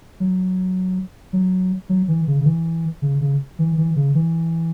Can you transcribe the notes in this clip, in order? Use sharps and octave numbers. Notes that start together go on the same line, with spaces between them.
F#3
F#3
F#3
E3
C#3
C#3
E3
C#3
C#3
E3
E3
C#3
E3